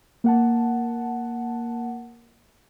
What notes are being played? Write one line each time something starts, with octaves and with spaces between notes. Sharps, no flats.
A#3 F#5 A5